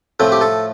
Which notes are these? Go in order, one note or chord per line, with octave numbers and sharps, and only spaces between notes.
A2 F3 A3 C4
G4
A4